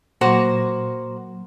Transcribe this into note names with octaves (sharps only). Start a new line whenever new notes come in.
A#2 F#3 A#3 F#4 C5